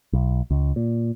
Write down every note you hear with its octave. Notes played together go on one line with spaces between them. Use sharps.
B1
C#2
A#2